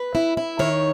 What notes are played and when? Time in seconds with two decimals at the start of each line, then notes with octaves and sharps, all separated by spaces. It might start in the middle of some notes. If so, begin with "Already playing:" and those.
Already playing: B4
0.15 E4
0.37 E4
0.59 D#3 C#5